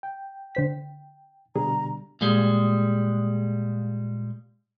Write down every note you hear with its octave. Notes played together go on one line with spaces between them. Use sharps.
G5
D3 C5 B6
B2 D3 G3 G#4 A#5
A#2 G3 G#3